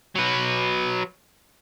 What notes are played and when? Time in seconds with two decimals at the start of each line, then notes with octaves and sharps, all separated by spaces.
0.16 F#3 B4